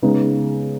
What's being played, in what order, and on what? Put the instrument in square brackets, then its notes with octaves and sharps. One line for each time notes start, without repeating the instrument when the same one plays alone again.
[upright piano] C#3 G#3 B3 D#4